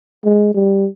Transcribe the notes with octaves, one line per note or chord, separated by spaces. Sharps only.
G#3
G3